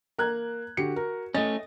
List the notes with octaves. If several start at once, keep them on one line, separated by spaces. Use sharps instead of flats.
A#3 A#5 F#6 G#6
D3 F#4 G4 C#7
A#4
A3 C#4 D#5 A6